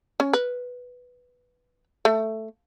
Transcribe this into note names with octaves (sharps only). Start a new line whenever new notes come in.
C#4
B4
A3